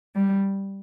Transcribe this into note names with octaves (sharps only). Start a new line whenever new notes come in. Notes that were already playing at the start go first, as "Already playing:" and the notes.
G3